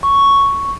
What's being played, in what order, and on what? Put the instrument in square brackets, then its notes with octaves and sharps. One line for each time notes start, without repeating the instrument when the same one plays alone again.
[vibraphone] C#6